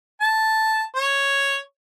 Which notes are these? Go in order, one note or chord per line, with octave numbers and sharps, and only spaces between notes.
A5
C#5